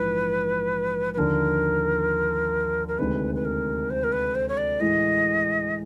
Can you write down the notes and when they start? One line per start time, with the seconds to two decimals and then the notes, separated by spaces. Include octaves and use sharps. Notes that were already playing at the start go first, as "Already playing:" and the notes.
Already playing: A#1 G#2 E3 B4
1.13 B4
1.17 D#2 D3 F3 A#4
2.88 A#4
2.98 D2 C3 D#3 G#3 B4
3.35 B4
3.45 A#4
3.90 C5
4.03 A#4
4.12 B4
4.35 C5
4.48 C#5
4.57 D5
4.80 A2 E3 G#3 D#5